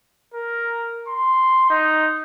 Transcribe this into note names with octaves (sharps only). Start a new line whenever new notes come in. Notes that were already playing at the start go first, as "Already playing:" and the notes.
A#4
C6
D#4